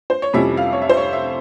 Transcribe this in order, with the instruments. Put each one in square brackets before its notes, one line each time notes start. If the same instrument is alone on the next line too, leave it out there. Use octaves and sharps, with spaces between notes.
[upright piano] C5
C#5
F2 C3 G3 C#4 E4 E5
F5
C#5
E5
C5
C#5
E5